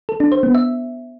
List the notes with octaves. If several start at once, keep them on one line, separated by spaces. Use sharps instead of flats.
A4
D4
C5
B3
E5